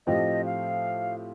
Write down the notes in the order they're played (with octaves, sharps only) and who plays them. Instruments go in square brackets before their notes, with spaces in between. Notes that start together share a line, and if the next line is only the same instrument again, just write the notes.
[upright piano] A2 F3 A3 C4 G4 [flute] D#5
[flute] F5